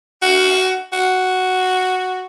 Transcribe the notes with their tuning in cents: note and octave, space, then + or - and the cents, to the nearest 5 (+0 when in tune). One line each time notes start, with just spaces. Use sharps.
F#4 +15
F#4 +0